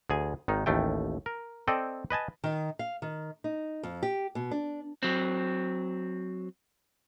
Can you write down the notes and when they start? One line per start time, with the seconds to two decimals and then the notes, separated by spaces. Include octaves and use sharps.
0.10 D2 G#4 G#5
0.48 G#1 D#3 D#4
0.66 A1 D#2 A3 G5
1.26 A#4
1.68 C4 A4 D5 D#5 G5
2.10 B4 D#5 G#5 A5
2.44 D#3
2.79 F5
3.02 D#3
3.44 D#4
3.83 F2
4.03 G4
4.35 B2
4.51 D4
5.03 F#3 C4